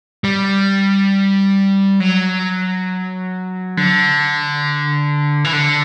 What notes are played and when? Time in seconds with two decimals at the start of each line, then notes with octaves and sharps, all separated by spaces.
0.24 G3
2.00 F#3
3.77 D3
5.45 E3
5.53 D3